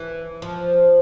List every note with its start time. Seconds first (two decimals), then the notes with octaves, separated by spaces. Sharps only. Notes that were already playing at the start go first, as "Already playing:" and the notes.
Already playing: E3
0.42 F3